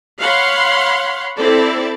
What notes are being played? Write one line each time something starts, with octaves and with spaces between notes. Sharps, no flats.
C#5 F5 F#5 B5 C6
C4 E4 A4 D5